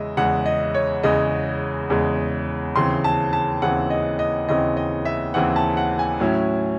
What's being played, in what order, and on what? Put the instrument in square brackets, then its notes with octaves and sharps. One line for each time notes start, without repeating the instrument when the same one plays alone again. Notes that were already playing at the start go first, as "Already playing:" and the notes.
Already playing: [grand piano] E2 C#3 G#3 D#5 E5
E2 C#3 G#3 F#5
D#5
C#5
E2 C#3 G#3 D#5
E2 C#3 G#3
D#2 C#3 E3 C4 C6
A5
A5
D#2 C#3 E3 C4 F#5
D#5
D#5
D#2 C#3 E3 C4 D#5
D#5
E5
D#2 C#3 E3 C4 F#5
A5
F#5
G#5
A2 F#3 C#4 E4